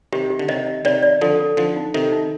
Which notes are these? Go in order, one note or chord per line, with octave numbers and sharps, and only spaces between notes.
C3 D#3 G4
G4
D3
C3 D#3 D#5
D#5
C3 D#3 D5
D5
D3 F3 A4
A4
D3 F3 D#4
D#4
C3 D#3 A4
D#4